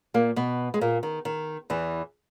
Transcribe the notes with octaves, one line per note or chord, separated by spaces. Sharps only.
A#2 A#3
B2 B3
G#3
A#2 A#3
D#3
D#3
E2 E3